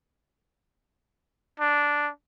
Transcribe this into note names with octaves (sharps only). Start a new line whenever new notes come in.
D4